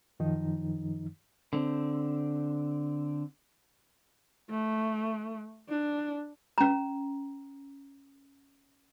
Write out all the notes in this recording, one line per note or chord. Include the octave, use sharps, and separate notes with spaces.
F#2 D#3 F3 D#4
D3 C4
A3
D4
C#4 A#5